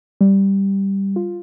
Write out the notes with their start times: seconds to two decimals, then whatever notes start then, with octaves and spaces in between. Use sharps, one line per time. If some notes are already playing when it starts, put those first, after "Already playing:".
0.21 G3
1.16 F4